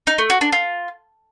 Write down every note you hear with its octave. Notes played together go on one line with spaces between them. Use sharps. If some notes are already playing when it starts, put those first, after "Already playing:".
D#4
A3
F#4
D4
F4